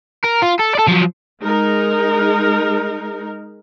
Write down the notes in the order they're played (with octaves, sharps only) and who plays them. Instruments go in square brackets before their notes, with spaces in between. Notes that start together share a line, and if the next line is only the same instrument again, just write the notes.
[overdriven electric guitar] A#4
F4
A4
A4 D5
F3 F#3
[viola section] G#3 D#4 A#4